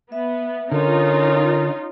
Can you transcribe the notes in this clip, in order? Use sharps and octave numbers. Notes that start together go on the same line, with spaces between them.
B3 E5
D3 C#4 D#4 F4 A#4